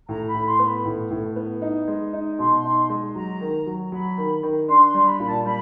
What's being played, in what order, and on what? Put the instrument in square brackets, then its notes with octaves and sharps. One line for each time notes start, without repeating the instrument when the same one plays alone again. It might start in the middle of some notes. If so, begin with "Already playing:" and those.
[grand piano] A2 [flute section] A#5
[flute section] B5
[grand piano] A2
[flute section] C6
[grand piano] B3
[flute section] B5
[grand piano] A2
A2
B3
D#4
G#3
D#4
[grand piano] B2 [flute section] C6
[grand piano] D#4
G#3
[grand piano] F#3 [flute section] A#5
[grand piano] D#3
F#3
[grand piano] F#3 [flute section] B5
[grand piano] D#3
D#3
[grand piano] D4 [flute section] C6
[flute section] C6
[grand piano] G3
[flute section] B5
[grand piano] A#2
[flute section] A5
[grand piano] G3 [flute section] B5